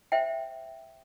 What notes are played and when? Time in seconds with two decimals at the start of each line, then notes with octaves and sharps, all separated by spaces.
0.12 C5 E5 G5